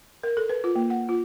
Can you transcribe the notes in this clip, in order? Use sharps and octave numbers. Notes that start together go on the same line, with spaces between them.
A#4
A4
B4
F4
A#3
F#5
F4